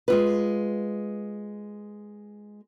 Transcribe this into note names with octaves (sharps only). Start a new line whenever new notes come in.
G#3 F4 B4